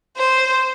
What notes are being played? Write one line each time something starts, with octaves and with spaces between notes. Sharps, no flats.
C5